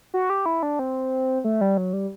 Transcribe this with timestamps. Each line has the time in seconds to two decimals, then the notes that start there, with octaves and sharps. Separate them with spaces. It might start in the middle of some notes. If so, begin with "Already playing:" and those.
0.14 F#4
0.30 G4
0.46 E4
0.63 D4
0.79 C4
1.44 A3
1.61 G3
1.77 F#3
1.93 G3